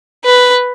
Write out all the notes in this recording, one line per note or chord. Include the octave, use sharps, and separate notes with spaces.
B4